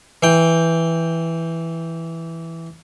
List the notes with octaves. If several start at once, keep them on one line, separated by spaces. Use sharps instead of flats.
E3 G5